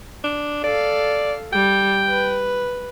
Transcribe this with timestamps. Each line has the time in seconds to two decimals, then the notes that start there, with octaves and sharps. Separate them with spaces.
0.24 D4
0.64 A4 D5 F5
1.53 G3 G5
2.06 B4